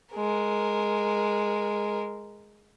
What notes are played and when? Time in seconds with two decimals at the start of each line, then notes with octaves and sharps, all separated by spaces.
0.14 G#3 A#4